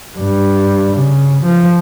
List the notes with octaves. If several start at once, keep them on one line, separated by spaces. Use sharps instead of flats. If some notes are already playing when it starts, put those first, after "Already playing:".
G2
C#3
F3